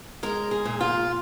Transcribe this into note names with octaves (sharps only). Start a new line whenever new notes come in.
G#3 A#4
G#4
A#2
F4